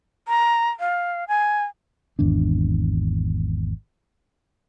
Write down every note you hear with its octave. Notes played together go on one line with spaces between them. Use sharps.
A#5
F5
G#5
G#1 E2 D4